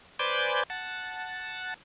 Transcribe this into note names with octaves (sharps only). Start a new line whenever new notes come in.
B4 C5 D5 G#5 D6 G6
F#5 A5